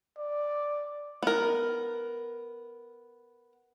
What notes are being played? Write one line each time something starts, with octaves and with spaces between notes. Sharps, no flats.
D5
B3 A#4